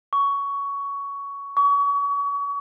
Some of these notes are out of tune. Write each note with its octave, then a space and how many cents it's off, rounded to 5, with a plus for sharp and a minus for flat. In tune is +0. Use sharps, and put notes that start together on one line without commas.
C#6 +15
C#6 +35